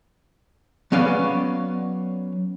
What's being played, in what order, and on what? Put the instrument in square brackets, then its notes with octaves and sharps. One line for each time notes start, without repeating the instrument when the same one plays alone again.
[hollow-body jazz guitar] F#3 B3 C#4 D5 F5